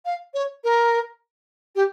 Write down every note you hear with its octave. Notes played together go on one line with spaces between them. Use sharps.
F5
C#5
A#4
G4